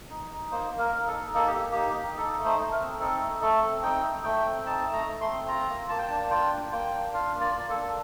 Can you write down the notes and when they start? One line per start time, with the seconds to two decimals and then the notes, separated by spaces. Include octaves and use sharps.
0.10 D#4
0.31 D#4
0.51 A#3 C5
0.72 A#3
0.79 A#4
0.93 D#4
1.07 A4
1.13 D#4
1.34 A#3 A4
1.47 G4
1.55 A#3
1.72 D#4 G4
1.97 D#4
2.17 D#4 A4
2.38 A3
2.45 C5
2.58 A3
2.72 A#4
2.79 C4
3.00 D#4 A4
3.21 A3
3.41 A3 A4
3.61 C4
3.82 D#4 G5
4.03 A3
4.23 A3 G5
4.45 C4
4.66 D#4 A5
4.87 A3
4.93 A#5
5.07 A3
5.21 C6
5.27 C4
5.48 F4 A#5
5.69 A#3
5.89 A#3 A5
5.99 G5
6.07 D4 A5
6.30 F4 G5
6.52 A#3
6.72 A#3 G5
6.93 D4
7.13 F4 F5
7.34 A#3
7.41 D5
7.55 A#3
7.70 A4
7.76 D4